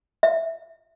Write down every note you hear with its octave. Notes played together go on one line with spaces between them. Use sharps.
E5